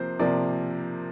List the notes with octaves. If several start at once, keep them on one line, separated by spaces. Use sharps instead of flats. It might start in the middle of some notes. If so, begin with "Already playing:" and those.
Already playing: C3 F3 A#3 C5
C3 F3 A#3 D5